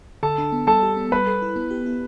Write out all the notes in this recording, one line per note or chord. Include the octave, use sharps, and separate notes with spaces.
D3 A4 A5
D4
B3
G3 A4 A5
G4
B3
G3 B4 B5
A4
E4
B3
G4
E4